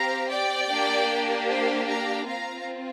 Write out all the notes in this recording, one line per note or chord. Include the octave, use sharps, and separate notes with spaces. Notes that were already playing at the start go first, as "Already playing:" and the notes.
Already playing: C4 G4 F5 A#5
D5 G5
A#3 D4 G4
C5 F5
F5 A#5
C4 F4 F5 A#5